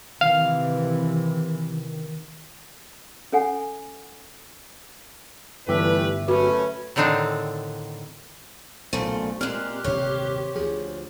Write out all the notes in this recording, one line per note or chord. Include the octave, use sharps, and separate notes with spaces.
C3 D#3 E3 F5
C#4 A4 F#5 G#5
G1 E3 G3 A3 G4 B4 E5
F#2 A3 C#4 F#4 B4
A2 D3 D#3 C4 D4
B1 A#2 C#3 A3 C5
A#2 G#3 C4 G4 F6 F#6
D#1 G#1 C3 C5 C#5
D2 F3 G#4